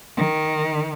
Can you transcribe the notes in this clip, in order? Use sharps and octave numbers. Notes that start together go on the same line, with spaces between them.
D#3